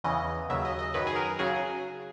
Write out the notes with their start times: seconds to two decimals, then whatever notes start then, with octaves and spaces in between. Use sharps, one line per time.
0.04 E2 C#3 E3 D#5
0.49 D#2 C#3 F#3 E5
0.65 D#5
0.79 D#5
0.94 F#2 D#3 F#3 B4
1.07 G#4
1.16 A#4
1.39 C#3 F#3 G#4